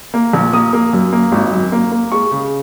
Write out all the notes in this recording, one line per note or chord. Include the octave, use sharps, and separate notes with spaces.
A#3
A#1
A#3 D#6
A#3
F#2
A#3
G#1
F#2
A#3
A#3
G#3 C#6
C#3